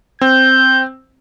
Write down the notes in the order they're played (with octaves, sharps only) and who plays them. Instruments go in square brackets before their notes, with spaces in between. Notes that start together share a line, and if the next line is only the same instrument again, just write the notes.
[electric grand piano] C4 [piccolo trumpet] G6